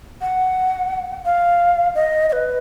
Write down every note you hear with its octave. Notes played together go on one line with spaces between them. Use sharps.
F#5
F5
D#5
D#5
B4